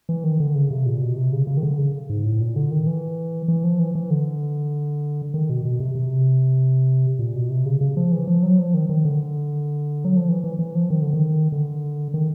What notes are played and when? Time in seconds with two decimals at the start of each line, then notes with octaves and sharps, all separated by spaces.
0.09 E3
0.24 D#3
0.40 D3
0.55 C#3
0.71 C3
0.86 A#2
1.02 B2
1.16 C3
1.32 C#3
1.47 C#3
1.57 D#3
1.63 D3
1.78 C#3
2.09 G#2
2.24 A2
2.41 A#2
2.56 D3
2.71 D#3
2.87 E3
3.48 E3
3.64 F3
3.79 E3
3.95 E3
4.11 D3
5.34 D#3
5.50 B2
5.65 B2
5.80 C3
5.95 C3
7.19 A#2
7.35 B2
7.50 C3
7.66 C#3
7.81 C#3
7.97 F3
8.12 E3
8.27 F3
8.43 F#3
8.59 F3
8.74 D#3
8.89 D#3
9.05 D3
10.05 F#3
10.17 F3
10.29 E3
10.44 E3
10.59 E3
10.75 F3
10.90 D#3
11.02 D3
11.14 D#3
11.52 D3
12.14 D#3